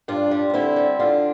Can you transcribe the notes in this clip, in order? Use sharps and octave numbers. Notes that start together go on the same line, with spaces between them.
G2 D4 F4
G3
F4
D3 C4 E4
G3
D3 D4 F4